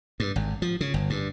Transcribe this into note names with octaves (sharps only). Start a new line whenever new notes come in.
G2
G#1
F3
C#3
G1
G2